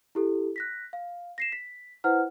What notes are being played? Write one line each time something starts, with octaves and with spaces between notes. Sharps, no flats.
E4 G4 A4
F#6 A#6 B6
F5
A#6 C7 E7
B6
E4 B4 C5 F#5 F6